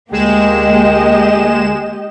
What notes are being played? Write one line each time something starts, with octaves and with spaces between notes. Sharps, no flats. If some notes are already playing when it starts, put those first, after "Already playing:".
D2 G#3 A#3 G4 D#5 E7